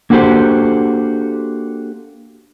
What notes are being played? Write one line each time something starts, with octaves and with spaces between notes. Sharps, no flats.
A#3 D4 F#4 G4 A4 C5